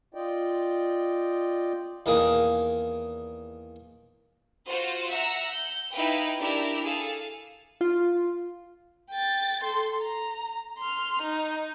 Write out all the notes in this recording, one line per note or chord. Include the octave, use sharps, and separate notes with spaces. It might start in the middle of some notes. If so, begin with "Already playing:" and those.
F4 D5 D#5 G5
E2 D#3 A#3 G#4
F4 F#4 C5 F#5
E5 F#5 A#5 E6
G6
D#4 E4 B4 F5 G5
D4 E4 G4 A#4
G#4 A4 F5
F4
G5 A6
A4 C6
A#5
C6 F6
D#4